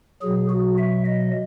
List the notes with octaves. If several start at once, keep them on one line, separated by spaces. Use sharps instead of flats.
B2 F#3 G#4
F#4
E5
D#5